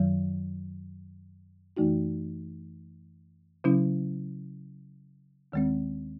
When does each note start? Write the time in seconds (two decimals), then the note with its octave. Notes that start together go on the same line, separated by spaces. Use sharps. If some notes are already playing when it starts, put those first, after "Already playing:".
Already playing: F#2 D#3 F#3
1.77 F#2 E3 A3 D#4 F#4
3.64 C#3 F#3 C#4 E4
5.52 D#2 D#3 G#3 C4